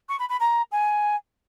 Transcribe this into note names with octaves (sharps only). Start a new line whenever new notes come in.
C#6
B5
B5
A#5
G#5